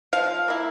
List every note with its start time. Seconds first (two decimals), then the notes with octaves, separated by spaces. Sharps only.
0.13 F3 F5
0.48 A#3 E4